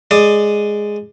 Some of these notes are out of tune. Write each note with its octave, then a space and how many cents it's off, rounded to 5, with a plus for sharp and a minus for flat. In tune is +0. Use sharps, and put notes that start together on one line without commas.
G#3 +0 D5 +15 D#6 +5